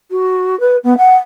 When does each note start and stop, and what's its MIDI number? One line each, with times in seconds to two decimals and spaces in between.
0.11 0.58 66
0.60 0.77 71
0.84 0.97 59
0.98 1.15 78